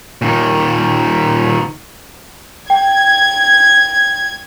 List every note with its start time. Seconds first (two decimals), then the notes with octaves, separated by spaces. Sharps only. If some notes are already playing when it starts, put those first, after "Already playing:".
0.22 A#2 D#3
2.70 G5 G#6